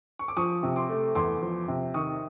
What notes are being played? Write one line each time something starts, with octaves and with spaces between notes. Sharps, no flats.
C#6
D6
F3 C#6 D#6
C3
C6 D6
A3
E2 C6 D6
F3
C3
D#3 C#6 D#6